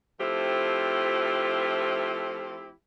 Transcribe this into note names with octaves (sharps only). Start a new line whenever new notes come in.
F3 A3 C4 E4 F4 G4